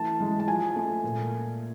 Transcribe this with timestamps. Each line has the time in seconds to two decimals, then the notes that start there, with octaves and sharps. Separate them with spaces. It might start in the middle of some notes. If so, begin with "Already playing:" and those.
Already playing: E3 A3 A5
0.20 G#3
0.40 A5
0.47 F3 G#5
0.76 A3
1.04 A#2